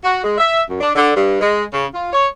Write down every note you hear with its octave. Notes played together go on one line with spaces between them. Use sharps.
F#4
G#3
E5
F#2
D4
D3
G2
G#3
C#3
F4
C#5